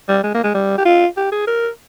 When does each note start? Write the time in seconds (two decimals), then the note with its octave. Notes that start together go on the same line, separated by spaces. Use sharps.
0.08 G3
0.23 G#3
0.34 A#3
0.44 G#3
0.55 G3
0.78 G4
0.85 F4
1.17 G4
1.32 G#4
1.47 A#4